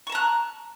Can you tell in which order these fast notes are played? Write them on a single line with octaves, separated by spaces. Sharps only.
C#6 A5 A#5 F#6